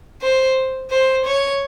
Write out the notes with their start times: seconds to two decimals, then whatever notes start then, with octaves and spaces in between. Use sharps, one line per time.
0.22 C5
0.91 C5
1.25 C#5